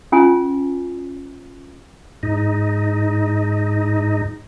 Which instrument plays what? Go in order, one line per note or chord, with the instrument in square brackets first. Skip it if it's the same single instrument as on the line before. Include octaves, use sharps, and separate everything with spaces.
[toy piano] C#4 F4 G#5
[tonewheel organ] G#2 D#4